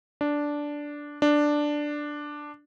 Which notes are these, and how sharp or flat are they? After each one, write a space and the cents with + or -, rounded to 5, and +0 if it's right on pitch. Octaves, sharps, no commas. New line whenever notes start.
D4 -5
D4 +5